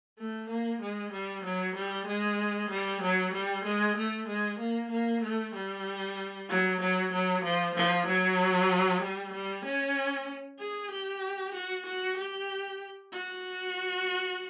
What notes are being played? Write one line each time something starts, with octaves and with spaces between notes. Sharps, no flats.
A3
A#3
G#3
G3
F#3
G3
G#3
G3
F#3
G3
G#3
A3
G#3
A#3
A#3
A3
G3
F#3
F#3
F#3
F3
F3
F#3
G3
G3
C#4
G#4
G4
F#4
F#4
G4
F#4